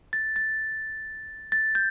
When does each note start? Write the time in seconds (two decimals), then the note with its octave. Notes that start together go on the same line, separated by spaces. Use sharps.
0.13 A6
0.36 A6
1.52 A6
1.75 G6